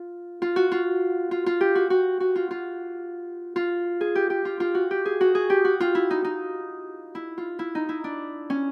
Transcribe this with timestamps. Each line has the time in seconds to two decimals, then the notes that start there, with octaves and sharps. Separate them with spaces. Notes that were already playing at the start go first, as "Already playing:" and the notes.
Already playing: F4
0.42 F4
0.56 F#4
0.72 F4
1.31 F4
1.46 F4
1.61 G4
1.75 F#4
1.90 F#4
2.20 F#4
2.36 F4
2.51 F4
3.56 F4
4.01 G#4
4.15 G4
4.30 G4
4.45 F4
4.60 F4
4.75 F#4
4.91 G4
5.05 G#4
5.21 F#4
5.35 G#4
5.50 G4
5.65 F#4
5.80 F4
5.95 E4
6.10 D#4
6.24 D#4
7.15 E4
7.38 F4
7.59 E4
7.75 D#4
7.89 E4
8.04 D4
8.50 C#4